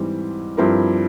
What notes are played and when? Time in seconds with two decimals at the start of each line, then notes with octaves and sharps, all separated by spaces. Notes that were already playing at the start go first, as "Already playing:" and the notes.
Already playing: G#2 E3 G3 C4
0.57 G2 F3 C4 E4 A#4